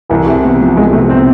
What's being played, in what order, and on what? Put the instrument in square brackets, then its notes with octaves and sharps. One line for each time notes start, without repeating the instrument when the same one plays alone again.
[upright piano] C2 [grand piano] E3
[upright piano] C3
B3
F3
[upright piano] C2 [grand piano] G#3
[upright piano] C3 [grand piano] A3
[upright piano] B3 [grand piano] C4